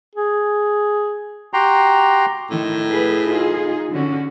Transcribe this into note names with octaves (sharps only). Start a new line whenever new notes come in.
G#4
F#4 G4 G5 A#5 C6
A2 D#3
G#4 B4
D#4 F4 G#4
D3 C#4 F#4